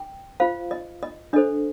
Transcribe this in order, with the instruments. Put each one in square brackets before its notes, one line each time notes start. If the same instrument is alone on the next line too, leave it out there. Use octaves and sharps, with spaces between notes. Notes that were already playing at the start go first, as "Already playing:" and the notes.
Already playing: [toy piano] G5
F4 C5 F5
D#5
D#5
D4 A4 C5 D#5